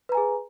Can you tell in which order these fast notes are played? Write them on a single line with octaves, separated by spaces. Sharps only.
B4 A#5 G#5 G#4